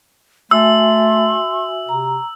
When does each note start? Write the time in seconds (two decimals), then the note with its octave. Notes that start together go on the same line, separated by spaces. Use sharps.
0.51 A3 F#4 E5 G#5 C6 E6
1.89 C3 A#5